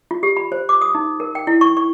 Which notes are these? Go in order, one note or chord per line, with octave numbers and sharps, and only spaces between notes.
F4
G4
B5
C5
D6
D#6
D#4
A#4
G5
E4
C#6
C#6